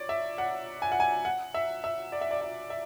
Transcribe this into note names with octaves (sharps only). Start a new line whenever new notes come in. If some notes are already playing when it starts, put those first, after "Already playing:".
Already playing: C#5 D5
E5
F#5
G#5
F#5
G#5
F#5
E5
E5
D5
E5
D5
E5
E5